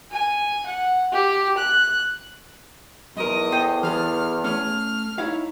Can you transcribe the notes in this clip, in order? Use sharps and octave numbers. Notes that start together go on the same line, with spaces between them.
G#5
F#5
G4
F#6
B1 E2 A#4 D#5
A4 C5 G5
E3 G#4 A4 F6
A3 C#4 F6
D#4 E4 C#5 F5